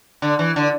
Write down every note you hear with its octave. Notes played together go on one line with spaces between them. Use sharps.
D3
E3
D3